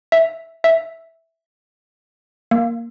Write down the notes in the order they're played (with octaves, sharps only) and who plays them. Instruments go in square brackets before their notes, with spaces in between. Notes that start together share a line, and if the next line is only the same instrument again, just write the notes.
[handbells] E5
E5
A#3